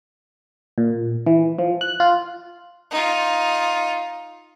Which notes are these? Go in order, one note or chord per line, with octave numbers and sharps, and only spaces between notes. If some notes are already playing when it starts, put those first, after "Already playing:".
A#2
E3
F3
F#6
F4
D#4 F4